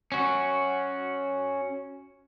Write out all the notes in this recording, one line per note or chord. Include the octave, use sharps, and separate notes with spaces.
C#4 F#4